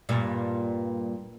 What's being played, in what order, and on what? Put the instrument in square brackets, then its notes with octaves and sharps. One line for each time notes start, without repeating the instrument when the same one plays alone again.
[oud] G2 A#2 G3